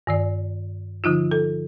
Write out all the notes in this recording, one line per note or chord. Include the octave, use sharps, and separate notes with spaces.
G2 D#3 D5
D3 F3 D#4 F4
A4